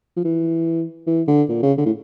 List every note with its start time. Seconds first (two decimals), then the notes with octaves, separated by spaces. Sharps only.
0.17 F3
0.25 E3
1.07 E3
1.28 D3
1.49 A#2
1.63 C#3
1.78 D3
1.86 A2